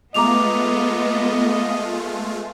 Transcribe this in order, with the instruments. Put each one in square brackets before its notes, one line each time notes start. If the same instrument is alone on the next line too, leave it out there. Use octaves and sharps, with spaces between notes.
[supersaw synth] G#3 A3 F4 [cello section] B3 [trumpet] D#5 [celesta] A#5 D6 F7